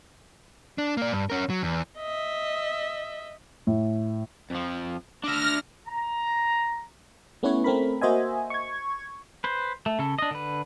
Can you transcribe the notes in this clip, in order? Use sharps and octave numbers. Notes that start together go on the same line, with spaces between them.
D4
A#3 D5
G2
C#4 A#4
F#3
E2
D#5 E5
A2
F2 F3
D4 E5 F6 A#6
A#5
A3 B3 C#4 E4 B4 C#5
A3 C4 A#4 B5
A#3 F#4 C5 D#5 E5 G#5
C#6 G#6
B4 C5
A3
C#3 A4
D4 D#5
D3 B4